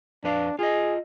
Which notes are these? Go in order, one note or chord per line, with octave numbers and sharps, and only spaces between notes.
F2 D4 B4 F5
F4 G#4 D#5